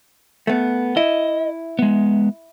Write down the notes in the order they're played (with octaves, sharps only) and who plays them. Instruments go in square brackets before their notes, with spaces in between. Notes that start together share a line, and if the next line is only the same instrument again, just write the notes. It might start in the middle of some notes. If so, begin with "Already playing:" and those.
[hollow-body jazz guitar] A3 B3
[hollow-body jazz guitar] E4 [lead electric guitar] D#5
[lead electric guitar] G#3 B3